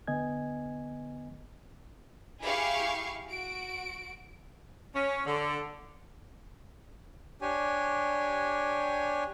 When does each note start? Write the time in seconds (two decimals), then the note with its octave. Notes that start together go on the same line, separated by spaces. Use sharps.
0.07 D3 B3 D#5 G#5 G#6
2.41 E4 G4 G#4 F5 C#6
3.28 F#4 D7
4.95 C#4
5.26 D3
7.41 D4 G4 C#5 G#5